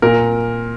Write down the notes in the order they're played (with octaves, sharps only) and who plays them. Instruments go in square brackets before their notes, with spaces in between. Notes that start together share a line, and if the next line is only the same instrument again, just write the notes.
[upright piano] A#2 A#4